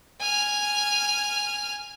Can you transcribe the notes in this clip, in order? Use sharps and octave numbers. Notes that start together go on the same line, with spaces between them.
G#5 F6